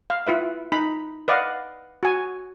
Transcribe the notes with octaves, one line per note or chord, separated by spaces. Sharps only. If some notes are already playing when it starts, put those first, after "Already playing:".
F5
E4 F4 B4 E5
D#4 B5
B4 D5 D#5 F5 F#5
F#4 G#5